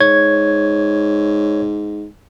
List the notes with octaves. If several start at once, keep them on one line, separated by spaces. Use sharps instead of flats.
G#2 C#5 G#6